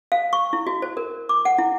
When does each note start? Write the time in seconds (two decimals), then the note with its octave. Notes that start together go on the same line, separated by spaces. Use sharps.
0.12 F5
0.33 C#6
0.53 E4
0.67 F#4
0.82 C5
0.97 A#4
1.29 D6
1.45 F#5
1.58 E4